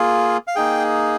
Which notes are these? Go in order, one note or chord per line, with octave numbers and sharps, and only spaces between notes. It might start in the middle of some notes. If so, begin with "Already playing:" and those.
Already playing: A#3 F4 G#4
F5
A#3 D#4 G#4 G5